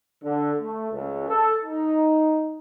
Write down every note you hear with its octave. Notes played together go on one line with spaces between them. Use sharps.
D3
A3
C#2
A4
D#4